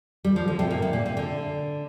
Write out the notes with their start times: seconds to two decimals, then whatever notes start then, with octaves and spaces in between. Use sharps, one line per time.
0.25 G3
0.36 F3
0.48 D3
0.59 C3
0.71 A#2
0.82 C3
0.93 A#2
1.06 C3
1.17 D3